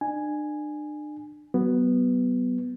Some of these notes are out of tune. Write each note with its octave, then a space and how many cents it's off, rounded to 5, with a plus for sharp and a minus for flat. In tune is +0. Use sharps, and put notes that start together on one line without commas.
D4 +35 G#5 +0
F#3 +30 B3 +0